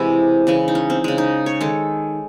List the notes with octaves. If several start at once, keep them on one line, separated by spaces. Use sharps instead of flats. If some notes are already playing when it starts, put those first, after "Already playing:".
Already playing: C3 E3 G#3 E4 F#4 G#4
C#3 E3 G#3
D#4
C#4
C4
C#3 G#3
D#4
C#5
D#3 G#3 A4